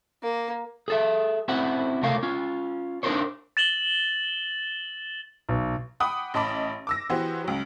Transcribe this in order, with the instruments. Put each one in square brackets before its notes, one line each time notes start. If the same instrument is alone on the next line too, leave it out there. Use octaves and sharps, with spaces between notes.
[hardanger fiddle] A#3
[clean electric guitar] G#4 A4 E5
C4 C#4 E4 F#4 C5 F#5
C#2 C3 A3 A#4 C#5 F5
C#4 F4
D4 D#4 G4 A#4 C5 C#5
[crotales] A6 E7 F#7 G7
[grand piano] B1
[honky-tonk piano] F#5 G5 B5 D6 D#6
A1 D#5 A5 B5 D6
D6 E6 A#6
E3 B3 F#4 G4 C5
C#2 F#3